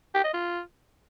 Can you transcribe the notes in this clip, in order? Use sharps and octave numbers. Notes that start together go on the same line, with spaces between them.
G4
D#5
F4